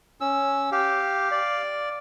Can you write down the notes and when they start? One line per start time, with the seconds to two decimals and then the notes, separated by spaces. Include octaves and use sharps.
0.21 C#4 E6
0.72 G4 F5
1.32 D5